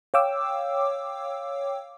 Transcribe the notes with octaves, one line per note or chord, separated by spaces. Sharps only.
C#5 F5 G5 D6 E6